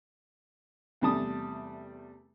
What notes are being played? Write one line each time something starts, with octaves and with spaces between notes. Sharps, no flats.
E2 C3 G3 A3 A5 D#6